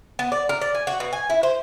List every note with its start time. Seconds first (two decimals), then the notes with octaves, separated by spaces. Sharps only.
0.19 B3
0.32 D5
0.49 A#4
0.61 D5
0.75 G#5
0.87 F#4
1.00 B2
1.13 G#5
1.30 E4
1.43 C5